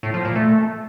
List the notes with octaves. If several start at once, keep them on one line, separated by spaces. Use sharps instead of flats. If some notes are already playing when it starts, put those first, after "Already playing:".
A2
F3
A#2
A3